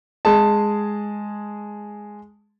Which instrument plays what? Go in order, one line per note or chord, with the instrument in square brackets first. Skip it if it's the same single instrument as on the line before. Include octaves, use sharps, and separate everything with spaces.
[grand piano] G#3 G#4 A5